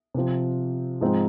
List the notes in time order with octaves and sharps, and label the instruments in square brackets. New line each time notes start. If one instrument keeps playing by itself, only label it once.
[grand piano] C3 F3 C4
G#2 F3 G#3 C4 D#4